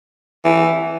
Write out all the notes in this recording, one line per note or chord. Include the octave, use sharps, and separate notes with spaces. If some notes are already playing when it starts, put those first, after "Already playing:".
E3